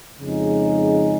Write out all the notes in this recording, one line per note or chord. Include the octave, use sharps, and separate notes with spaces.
F2 C#3 G#3 D#4 G#4